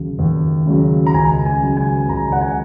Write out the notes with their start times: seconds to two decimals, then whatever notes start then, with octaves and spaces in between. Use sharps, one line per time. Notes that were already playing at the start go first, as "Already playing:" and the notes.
Already playing: D#2 C#3 F#3
0.19 D#2
0.66 C#3 F#3
1.07 A#5
1.14 C#2 G#5
1.46 G#5
1.62 C#3 F#3
1.77 G#5
2.09 C#2 A#5
2.32 F#5
2.41 G#5